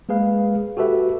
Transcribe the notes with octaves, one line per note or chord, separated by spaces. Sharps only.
G#3 A#3 G#4 B4 F5
F#4 G4 A4 B4 E5